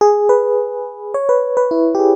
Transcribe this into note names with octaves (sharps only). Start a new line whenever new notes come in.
G#4
B4
C#5
B4
B4
E4
G4
G#4